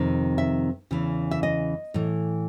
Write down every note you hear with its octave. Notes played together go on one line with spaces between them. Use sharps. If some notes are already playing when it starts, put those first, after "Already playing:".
Already playing: F2 C3 D#3
E5
E2 C#3 E3
E5
D#5
A2 E3